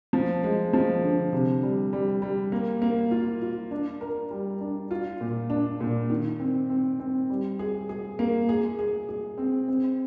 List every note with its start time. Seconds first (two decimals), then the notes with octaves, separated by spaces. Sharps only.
0.13 F3
0.43 G#3
0.73 F3
1.03 D3
1.33 C3
1.63 G3
1.93 G3
2.22 G3
2.52 A#3
2.82 A#3
3.11 F4
3.42 F4
3.71 D4
4.01 A#4
4.31 G3
4.61 D4
4.91 F4
5.21 A#2
5.50 D4
5.80 A#2
6.10 D#3
6.40 C4
6.70 C4
7.00 C4
7.30 G3
7.59 G#4
7.89 G#4
8.19 A#3
8.49 G#4
8.79 G#4
9.09 G#4
9.38 C4
9.68 C4